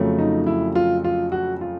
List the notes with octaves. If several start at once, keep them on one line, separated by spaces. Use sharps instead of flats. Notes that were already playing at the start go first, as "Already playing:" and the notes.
Already playing: F2 C#3 F#3 A3
D#4
E4
F4
F4
F#4
F4